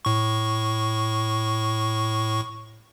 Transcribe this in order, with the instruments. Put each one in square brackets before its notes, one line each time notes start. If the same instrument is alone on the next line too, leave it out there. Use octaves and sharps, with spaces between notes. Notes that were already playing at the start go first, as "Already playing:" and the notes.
[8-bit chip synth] A2 C#6